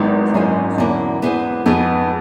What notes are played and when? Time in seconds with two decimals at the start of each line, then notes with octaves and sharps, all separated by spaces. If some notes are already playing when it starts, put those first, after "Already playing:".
Already playing: G#1 G#2 F#3 B3 E4 G4
0.34 F#1 F#2 G#3 C#4 E4 G#4 C5
0.78 E2 D3 F#3 A#3 C#4 E4
1.22 B3 E4 G#4 C5
1.66 F2 B3 D#4 G#4